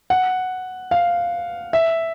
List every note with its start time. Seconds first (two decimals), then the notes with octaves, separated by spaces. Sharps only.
0.10 F#5
0.91 F5
1.73 E5